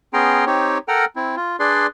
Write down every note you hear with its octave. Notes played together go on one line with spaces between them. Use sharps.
B3 C#4 G#4 G5 A#5 C6
C4 D#4 G4 C#5
A4 A#4 F#5 G5 A#5 F6
C4 E4
F4
D4 G#4 B4 D5 C6